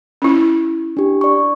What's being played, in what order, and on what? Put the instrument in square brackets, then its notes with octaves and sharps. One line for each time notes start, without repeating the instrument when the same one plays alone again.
[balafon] C#4 E4
[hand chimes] D4 G4
D5 C#6